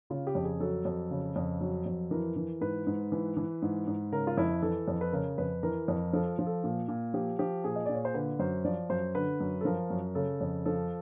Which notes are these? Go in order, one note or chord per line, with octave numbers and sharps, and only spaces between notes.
C#3 F4
G4
F2
G#4
F#3 A4
F2
C#3
F2
F#3
F2
E3 A#4
E3
G#2 B4
G#2
E3
E3
G#2
G#2
C#3 A#4
F4
F2 E4
E3 A4
F2
B4
C#3 A#4
F2 B4
E3 A#4
F2
F3 A4
F3
A4
A#2
A#2
F3 G4
F3 G4
A#2 G#4
D#5
A#2 D5
C#5
C5
D3 B4
F#2 C5
F3 D5
F#2 C5
D3 B4
F#2
A4
F3 A#4
F#2
C#3 A4
F2
F3 A4